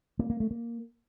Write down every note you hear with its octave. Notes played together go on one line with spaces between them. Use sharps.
A#3
A#3
A3
A#3